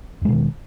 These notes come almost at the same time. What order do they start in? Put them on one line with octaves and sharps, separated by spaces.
E2 G#3 B2 D#3